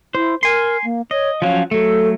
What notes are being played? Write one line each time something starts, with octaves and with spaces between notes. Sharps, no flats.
E4 C5
A#4 G#5 C6
A#3
C#5 D#5
F3 F#3 C#4 F5
F#3 A3 A4